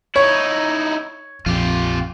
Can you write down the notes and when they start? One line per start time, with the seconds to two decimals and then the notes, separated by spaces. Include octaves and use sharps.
0.16 D#4 E4 C#5
1.46 A#1 F2 F4 G4